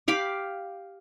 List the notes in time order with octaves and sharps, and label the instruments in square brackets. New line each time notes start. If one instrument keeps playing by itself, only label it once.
[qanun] G4 F5 B5 D6